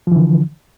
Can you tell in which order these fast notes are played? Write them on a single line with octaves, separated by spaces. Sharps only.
F3 E3 D3